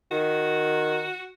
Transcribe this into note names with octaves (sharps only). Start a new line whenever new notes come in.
D#3 F#4